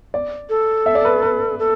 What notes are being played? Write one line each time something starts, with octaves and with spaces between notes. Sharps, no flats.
D5
A4
E5
D5
B4
B4
A4